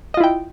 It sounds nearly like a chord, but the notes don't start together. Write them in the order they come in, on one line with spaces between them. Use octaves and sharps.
D#5 F4 E4 G5